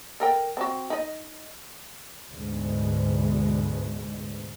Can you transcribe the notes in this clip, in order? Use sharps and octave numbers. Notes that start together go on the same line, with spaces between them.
A4 A#4 G5
C4 F#4
D#4 D#5
D2 G#2 B2 G#3